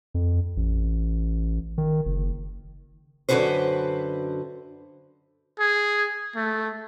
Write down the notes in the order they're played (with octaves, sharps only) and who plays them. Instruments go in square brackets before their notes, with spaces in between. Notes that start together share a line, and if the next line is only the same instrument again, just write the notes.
[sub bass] F2
A1
D#3
F#1
[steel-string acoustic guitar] F#2 D3 D#3 F#4 B4 C5
[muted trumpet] G#4
A3